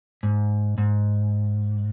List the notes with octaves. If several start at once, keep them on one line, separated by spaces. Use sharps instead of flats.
G#2
G#2